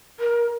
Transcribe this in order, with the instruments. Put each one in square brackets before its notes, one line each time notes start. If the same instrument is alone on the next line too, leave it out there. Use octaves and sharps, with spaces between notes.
[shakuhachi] A#4